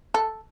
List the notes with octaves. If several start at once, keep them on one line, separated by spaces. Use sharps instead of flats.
A4